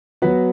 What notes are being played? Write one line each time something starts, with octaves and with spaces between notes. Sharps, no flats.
F#3 B3 F#4 B4